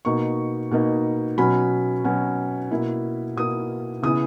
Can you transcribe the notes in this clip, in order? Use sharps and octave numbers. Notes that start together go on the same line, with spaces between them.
B2 A#3 D#4 C#6
B2 A#3 D#4
B2 F#3 C#4 B5
B2 F#3 C#4
B2 A#3 E4
B2 A#3 E4 D#6
C#3 E3 B3 E4 D#6